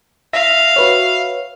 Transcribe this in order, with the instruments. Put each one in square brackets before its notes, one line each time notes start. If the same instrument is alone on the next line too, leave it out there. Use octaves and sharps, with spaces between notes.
[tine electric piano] E5 [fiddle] F5 [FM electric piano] A#6
[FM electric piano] F#4 B4 C#5